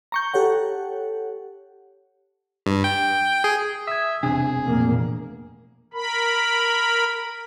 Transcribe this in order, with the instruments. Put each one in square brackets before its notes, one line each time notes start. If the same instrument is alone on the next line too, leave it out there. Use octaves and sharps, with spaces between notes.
[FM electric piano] A#5 C#6 G6
G4 A4 C#5 F#5
[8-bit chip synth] G2
G5
G#4
[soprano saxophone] E5 [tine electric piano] D#6 G#6
[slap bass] E1 C4 D4 [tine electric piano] C3 [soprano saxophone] G#4
[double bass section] F1 A#2 A#3
[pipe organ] A#4 B5